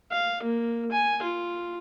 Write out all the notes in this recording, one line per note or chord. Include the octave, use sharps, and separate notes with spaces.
F5
A#3
G#5
F4